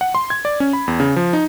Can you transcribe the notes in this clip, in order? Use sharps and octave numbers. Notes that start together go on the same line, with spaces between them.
F#5
C6
G#6
D5
C#4
B5
E2
C#3
F3
D#4